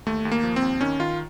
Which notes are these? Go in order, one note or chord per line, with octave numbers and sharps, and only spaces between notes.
D#2 A3
D#2
A#3
F3
C4
D#2
D#3 C#4
D#3 F4